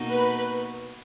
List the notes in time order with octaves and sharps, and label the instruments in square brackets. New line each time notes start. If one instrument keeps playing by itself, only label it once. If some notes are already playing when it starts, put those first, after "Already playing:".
Already playing: [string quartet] B2 A#3 D#4 F#4
[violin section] B4